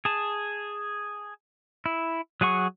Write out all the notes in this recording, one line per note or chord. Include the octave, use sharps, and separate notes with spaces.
G#4 A5
E4
F#3 G#4 F#5 C#6